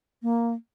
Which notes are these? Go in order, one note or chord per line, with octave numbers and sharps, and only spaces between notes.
A#3